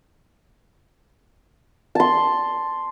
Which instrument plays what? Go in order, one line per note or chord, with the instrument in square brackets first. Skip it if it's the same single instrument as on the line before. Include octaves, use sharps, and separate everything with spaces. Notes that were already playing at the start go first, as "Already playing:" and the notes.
[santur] A5 C6